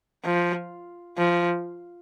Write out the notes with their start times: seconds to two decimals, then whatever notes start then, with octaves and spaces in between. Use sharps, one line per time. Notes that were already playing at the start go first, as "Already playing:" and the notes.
0.25 F3
1.18 F3